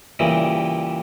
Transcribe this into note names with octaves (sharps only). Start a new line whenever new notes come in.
G2 A#2 C#3 E3 G3